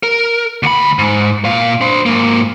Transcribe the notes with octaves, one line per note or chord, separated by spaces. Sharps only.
A#4
D2 B5
G#2
A#2 F5
D4 C5
G#2 A#3